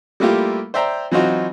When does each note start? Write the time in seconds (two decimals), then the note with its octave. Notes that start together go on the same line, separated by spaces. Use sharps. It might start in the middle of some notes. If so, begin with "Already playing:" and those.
0.20 G3 A3 A#3 E4 F4 G4
0.74 C5 D5 E5 G5 A#5
1.11 E3 F#3 C4 D#4 F4 F#4